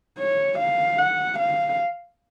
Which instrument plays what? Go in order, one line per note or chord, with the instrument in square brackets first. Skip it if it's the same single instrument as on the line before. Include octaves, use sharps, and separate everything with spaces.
[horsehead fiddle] C#5
F5
F#5
F5